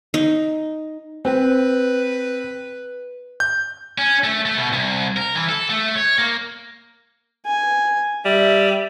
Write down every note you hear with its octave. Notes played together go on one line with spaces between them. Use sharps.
D#4
C4 B4
G6
C#4
A3
A3
B2
C2
A#4
E3
A4
A3
C#5
A#3
G#5
G3 E5